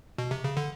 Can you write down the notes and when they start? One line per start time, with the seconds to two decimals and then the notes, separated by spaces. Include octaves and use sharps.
0.18 B2
0.31 C3
0.44 C#3
0.57 D3